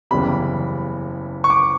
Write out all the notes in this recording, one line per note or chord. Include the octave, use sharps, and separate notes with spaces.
F#1 E2 C#3 E3 G3 B5
C#6
D6